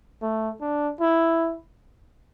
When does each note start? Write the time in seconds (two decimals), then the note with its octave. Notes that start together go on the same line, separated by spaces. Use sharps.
0.22 A3
0.61 D4
1.01 E4